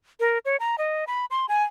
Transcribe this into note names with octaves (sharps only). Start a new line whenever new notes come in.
A#4
C#5
A#5
D#5
B5
C6
G#5